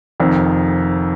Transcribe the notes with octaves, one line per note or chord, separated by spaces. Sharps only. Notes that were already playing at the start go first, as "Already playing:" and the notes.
F1 F2 D#3